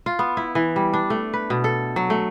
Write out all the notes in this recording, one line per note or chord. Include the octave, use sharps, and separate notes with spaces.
F4
B3
E4
E3
G3
D4
A3
B4
B2
A4
F#3
A3